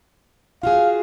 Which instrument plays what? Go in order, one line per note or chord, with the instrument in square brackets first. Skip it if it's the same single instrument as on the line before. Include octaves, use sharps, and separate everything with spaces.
[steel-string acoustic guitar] F4 F#4 G#4 [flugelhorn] F5